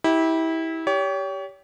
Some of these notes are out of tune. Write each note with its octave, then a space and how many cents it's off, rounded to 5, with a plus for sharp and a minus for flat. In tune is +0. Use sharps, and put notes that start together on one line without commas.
E4 -25 G4 +0
G4 +0 C#5 +35